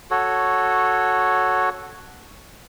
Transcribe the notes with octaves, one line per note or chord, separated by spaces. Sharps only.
F#4 A4 C#5